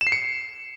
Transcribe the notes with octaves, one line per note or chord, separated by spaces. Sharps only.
E7
C7
C#7